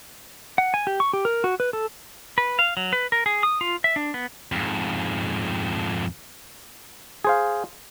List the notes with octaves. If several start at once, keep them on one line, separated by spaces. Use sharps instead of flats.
F#5
G#5
G4
C#6
G4
A#4
F#4
B4
A4
B4
F5
F#3
B4
A#4
G#4
D#6
F4
E5
D4
B3
F2 G#2
G#4 C5 F5